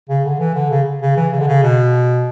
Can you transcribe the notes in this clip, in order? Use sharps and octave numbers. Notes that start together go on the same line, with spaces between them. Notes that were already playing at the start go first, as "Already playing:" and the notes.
C#3
D3
E3
D3
C#3
C#3
E3
C#3
D3
C#3
B2